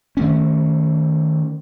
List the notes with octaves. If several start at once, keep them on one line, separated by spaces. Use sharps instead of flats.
D#3 A3 C#4